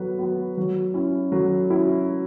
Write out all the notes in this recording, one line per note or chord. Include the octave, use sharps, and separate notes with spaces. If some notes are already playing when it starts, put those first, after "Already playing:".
Already playing: F#3 B3 B4
B3 F#4 B4
F#3
C#4 E4
F#3
C#4 E4